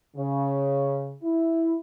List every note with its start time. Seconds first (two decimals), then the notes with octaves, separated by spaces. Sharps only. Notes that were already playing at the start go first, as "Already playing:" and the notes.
0.16 C#3
1.22 E4